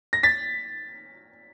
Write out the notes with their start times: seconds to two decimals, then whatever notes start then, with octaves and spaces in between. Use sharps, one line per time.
0.13 A#6
0.23 A6 B6